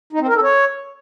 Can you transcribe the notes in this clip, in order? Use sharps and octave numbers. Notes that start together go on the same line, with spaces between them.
D#4
C4
A#4
A4
C#5